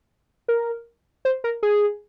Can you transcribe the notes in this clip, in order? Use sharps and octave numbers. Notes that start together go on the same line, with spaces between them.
A#4
C5
A#4
G#4